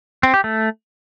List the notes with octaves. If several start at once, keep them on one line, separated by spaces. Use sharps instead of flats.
C4
G4
A3